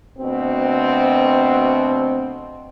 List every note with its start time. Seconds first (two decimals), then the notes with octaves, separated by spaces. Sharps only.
0.19 D2 B2 C4